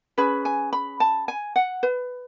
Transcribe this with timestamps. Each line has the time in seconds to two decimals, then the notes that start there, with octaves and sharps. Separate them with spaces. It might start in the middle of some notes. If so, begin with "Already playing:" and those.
0.18 C#4 G#4 B4 B5
0.45 G#5
0.73 B5
1.00 A5
1.28 G#5
1.56 F#5
1.83 B4